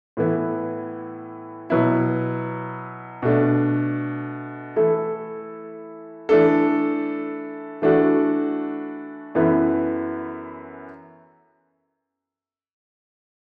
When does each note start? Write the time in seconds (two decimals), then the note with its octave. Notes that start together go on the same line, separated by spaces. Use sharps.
0.17 A2 E3 B3 E4
1.70 B2 F#3 B3 E4
3.22 B2 A3 D4
4.76 E3 A3 E4 A4
6.29 E3 A3 D4 A4
7.82 E3 A3 D4 F#4 A4
9.35 F#2 E3 B3 E4 A4